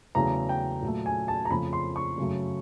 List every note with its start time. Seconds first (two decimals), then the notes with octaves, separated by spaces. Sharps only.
0.15 E2 C#3 F#3 A3 A#5
0.49 G5
0.82 A#2 F#3 A3
1.06 G#5
1.28 A5
1.45 A#5
1.50 F2 C#3 F3 A3 B5
1.73 C6
1.96 C#6
2.18 F#2 C#3 F#3 A3